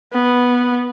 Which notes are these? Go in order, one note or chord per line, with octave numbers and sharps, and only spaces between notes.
B3